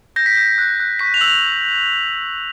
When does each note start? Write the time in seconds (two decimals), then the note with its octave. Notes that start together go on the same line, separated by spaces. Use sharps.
0.16 G6 A#6
0.26 B6
0.35 G6 A#6
0.58 F#6
0.80 F#6
0.99 C#6 B6
1.14 F7
1.21 E6 F#7
1.27 F7